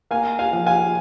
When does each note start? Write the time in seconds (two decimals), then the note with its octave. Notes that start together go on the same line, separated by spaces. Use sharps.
0.11 A#3 F5 G#5
0.39 F5 G#5
0.52 F3
0.66 F5 G#5